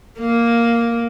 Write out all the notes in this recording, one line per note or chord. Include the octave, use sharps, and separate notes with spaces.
A#3